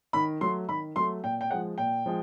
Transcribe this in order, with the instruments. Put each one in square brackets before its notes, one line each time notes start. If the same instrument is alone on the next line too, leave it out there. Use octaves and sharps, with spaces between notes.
[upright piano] D#3 B5
F#3 A3 C6
D#3 B5
F#3 A3 C6
A#2 G5
G5
F3 G#3 F#5
A#2 G5
F3 G#3